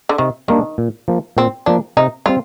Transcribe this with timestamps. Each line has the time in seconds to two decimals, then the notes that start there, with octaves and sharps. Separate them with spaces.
0.09 D3
0.18 C3 D#3
0.48 D#3 G3 A#3 D4
0.78 A#2
1.08 F3 A#3
1.37 A#2 C4
1.66 F3 A#3 D4
1.97 C3 D#4
2.26 G3 C4 F4